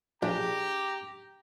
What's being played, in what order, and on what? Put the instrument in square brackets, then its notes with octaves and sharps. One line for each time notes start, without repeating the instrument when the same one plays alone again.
[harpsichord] A#1 [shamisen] D4 G#4 [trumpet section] G4 A#5